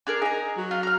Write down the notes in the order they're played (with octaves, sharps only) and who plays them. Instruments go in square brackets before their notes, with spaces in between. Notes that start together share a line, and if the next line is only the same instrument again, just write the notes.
[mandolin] D4 G#4 A#4
[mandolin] D#4 A#5 [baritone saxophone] G#4
[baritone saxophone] F#3
[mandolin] F4
A#5 F6